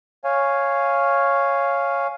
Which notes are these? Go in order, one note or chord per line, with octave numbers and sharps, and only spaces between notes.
C#5 F5 G#5